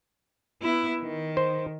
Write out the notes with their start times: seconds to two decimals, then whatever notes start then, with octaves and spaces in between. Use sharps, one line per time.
0.62 B3 E4
1.00 D#3
1.37 C5